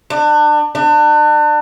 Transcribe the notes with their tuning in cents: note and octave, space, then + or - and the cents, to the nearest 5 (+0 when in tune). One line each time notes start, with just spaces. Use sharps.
D4 +30
D4 +35